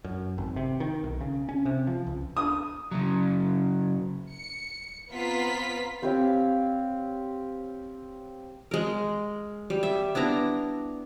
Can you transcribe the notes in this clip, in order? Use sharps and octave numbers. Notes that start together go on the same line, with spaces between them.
F#2
G#1
C3
D#3
B1
C#3
C#4
C3
F3
C#2
D#6
C#3 F#3
C#7
B3 C4 F4 A#5 B6
C4 G4 C#5 F5
G#3 A#4
G3
E5
B3 D4 E4 A#5